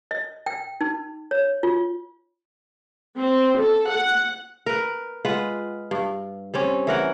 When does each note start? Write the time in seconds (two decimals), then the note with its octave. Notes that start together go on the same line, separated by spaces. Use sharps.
0.11 D#5
0.46 G5
0.81 D#4
1.31 C#5
1.63 F4
3.18 C4
3.58 A4
3.89 F#5
4.66 A#4 B4
5.25 G#3 F4 B4 F#5
5.91 G2
6.54 G3 C4 C#4
6.87 E3 A#4 F#5